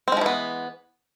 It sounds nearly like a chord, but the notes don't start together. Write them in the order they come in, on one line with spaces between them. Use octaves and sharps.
C4 G#3 F3 E3 B3